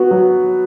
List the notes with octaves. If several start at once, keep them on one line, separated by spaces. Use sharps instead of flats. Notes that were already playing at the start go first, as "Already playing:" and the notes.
Already playing: B3 F#4
F#3